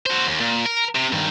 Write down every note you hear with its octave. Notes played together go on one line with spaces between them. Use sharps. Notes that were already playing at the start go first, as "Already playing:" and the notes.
F#4 C5
D#2
A#2
A#4
C3
G2 D#3